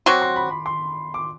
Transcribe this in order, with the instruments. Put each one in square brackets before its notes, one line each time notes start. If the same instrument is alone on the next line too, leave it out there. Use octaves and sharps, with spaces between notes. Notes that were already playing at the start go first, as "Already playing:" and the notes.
[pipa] F#3 C4 F#4 [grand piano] D6
[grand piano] C6
B5
B5
C6
D6